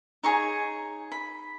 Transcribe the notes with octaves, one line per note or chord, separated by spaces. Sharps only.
D#4 G#4 C#5 C#6
B5